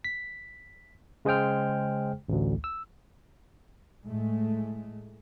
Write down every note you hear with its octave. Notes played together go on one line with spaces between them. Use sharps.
B6
C#3 G#3 G#4 C5 G5 F6
A1 D2
E6
A2 G#3 A3